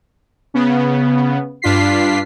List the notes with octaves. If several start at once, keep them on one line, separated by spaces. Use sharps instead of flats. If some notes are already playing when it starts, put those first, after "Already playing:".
C#3 B3
G2 D4 F4 B6 C7